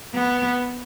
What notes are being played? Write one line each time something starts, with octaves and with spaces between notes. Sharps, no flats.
B3